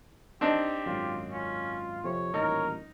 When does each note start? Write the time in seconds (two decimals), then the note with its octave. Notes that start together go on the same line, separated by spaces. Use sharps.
0.41 C4 D4 D#4 G4
0.86 G#1 F#2 F4
1.32 C#4 F4
2.04 F2 C3 C#5
2.34 D#1 A1 D#4 A#4